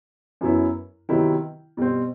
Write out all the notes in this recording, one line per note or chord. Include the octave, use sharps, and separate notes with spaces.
F#2 F#3 B3 E4
C3 D#3 F#3 B3 E4
B2 G3 C4